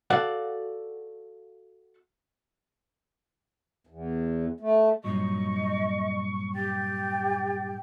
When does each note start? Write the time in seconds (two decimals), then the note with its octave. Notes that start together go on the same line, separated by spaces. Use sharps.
0.10 F#4 A4 D5 F5 F#5
3.87 E2
4.60 A3
5.04 G2 A#2 F#3 D#5 C#6
6.55 G4 G5 A6